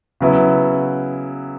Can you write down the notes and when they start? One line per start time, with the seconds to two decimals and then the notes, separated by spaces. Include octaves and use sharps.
0.20 C#3 F#3 B3 E4